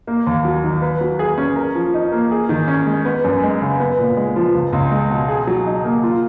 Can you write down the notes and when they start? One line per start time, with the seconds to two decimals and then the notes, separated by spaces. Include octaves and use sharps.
0.07 A#3
0.27 D#2
0.45 F#3
0.64 D#3
0.82 B4
1.01 F#3
1.19 G#4
1.38 C#4
1.56 A#4
1.75 F3
1.94 D#4
2.12 A#3
2.31 G#4
2.49 D#3
2.68 C#4
2.87 G#3
3.05 B3
3.24 F#2
3.43 G#3
3.62 C#3
3.80 B3
3.98 A#2
4.17 G#3
4.36 F3
4.55 C#2
4.73 C#2
4.91 G#3
5.10 B2
5.28 G#4
5.47 F#3
5.66 D#4
5.84 A#3
6.03 F4